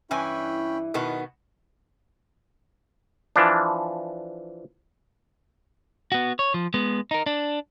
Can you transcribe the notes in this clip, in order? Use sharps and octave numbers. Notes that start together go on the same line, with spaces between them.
G2 E3 C#4 E4 G5 G#5 B5
B2 D#3 B3 D#6
E3 F3 D4
B3 F#4
C#5
F3
G#3 B3
D#4 A#4
D4